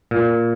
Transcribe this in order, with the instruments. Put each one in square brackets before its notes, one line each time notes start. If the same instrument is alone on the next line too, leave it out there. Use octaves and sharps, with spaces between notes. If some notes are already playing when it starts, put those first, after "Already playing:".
[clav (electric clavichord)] A#2